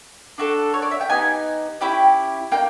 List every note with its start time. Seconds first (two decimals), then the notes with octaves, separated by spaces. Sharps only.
0.38 D4 F#4 A4
0.74 C#5
0.82 D5
0.91 E5
1.01 G5
1.09 B3 D#4 G4 G#5
1.81 C#4 E4 G4 G5
2.52 A#3 D#4 G5